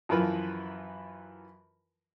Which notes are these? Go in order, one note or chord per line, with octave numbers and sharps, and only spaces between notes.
F#2 E3 F3 F4 A#4 B4